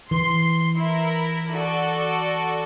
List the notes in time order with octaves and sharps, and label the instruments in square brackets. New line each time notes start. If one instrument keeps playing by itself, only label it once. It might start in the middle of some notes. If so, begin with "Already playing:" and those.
[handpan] E3 [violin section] C6
[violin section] E4 A#4
F#4 A4 D5